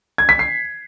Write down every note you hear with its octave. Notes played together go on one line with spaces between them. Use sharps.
G#6
B6
C7